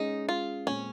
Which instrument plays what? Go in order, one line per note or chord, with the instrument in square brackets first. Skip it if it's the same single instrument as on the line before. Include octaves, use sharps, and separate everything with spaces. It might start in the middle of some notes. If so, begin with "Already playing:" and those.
Already playing: [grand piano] G#3 C#4 G#4 [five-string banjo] D#4
[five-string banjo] F4
[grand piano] A#2 G#3 C4 [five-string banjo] C#4